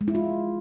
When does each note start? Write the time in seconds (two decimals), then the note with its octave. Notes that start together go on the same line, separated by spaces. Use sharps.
0.01 G#3
0.08 E4
0.15 F4